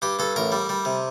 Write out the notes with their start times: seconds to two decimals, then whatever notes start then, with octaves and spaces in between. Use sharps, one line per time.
0.02 G2 G4
0.19 G2 A4
0.36 A1 A#4
0.52 G3
0.69 G3
0.85 C3